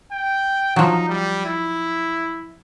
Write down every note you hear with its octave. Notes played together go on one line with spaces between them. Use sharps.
G5
F3 F#3 D#4
G3
E4